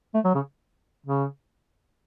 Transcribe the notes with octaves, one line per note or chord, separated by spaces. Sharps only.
A3
F#3
C#3
C#3